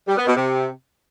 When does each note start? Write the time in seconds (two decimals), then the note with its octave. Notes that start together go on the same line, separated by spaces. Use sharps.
0.08 G3
0.17 B3
0.27 B2
0.36 C3